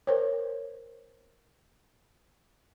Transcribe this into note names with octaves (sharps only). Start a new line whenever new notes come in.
A#4 C5 C#5